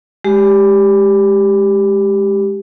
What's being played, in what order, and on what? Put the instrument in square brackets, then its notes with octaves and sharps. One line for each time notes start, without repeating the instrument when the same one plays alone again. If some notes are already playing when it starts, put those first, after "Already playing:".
[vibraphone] G#3 G4